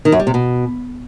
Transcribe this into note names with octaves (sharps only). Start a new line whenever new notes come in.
D#3
F#2
G3
C3
B2